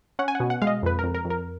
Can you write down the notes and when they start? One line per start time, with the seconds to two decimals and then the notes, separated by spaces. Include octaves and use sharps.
0.19 C#4 F#5
0.28 G#5
0.35 F#5
0.40 B2
0.50 F#5
0.62 G#3 F5
0.67 D#5
0.83 F2 B4
0.99 A#4
1.03 F2
1.15 A#4
1.25 F2
1.30 A#4